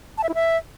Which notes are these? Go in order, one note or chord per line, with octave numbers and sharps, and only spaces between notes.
A5
E5
E4
E5